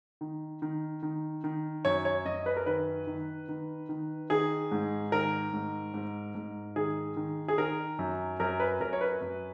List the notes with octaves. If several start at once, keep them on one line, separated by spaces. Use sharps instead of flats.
D#3
D#3
D#3
D#3
F#2 C#5
C#5
F#2 D#5
B4
A#4
D#3 B4
D#3
D#3
D#3
D#3 G#4
G#2
D#3 A#4
G#2
G#2
G#2
D#3 G#4
D#3
G#4
D#3 A#4
F#2
F#2 A#4
B4
F#2 A#4
C#5
B4
F#2